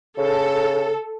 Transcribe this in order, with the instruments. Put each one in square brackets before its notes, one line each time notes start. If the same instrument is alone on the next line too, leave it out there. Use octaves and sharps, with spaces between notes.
[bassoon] C#3 [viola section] A4